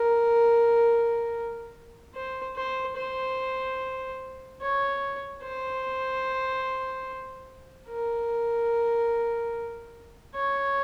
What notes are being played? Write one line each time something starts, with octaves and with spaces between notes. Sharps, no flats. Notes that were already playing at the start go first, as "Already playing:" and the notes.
Already playing: A#4
C5
C5
C5
C#5
C5
A#4
C#5